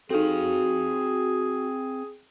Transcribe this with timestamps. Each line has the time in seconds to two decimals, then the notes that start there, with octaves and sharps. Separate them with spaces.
0.10 C4 D#4 F#4 G#4 A4 F5